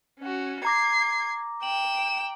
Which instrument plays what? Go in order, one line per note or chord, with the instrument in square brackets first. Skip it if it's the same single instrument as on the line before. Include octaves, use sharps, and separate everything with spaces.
[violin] C#4 F#4
[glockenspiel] A#5 D6 A#6 [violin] G#6 C7
[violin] G5 E7 [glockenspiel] F#7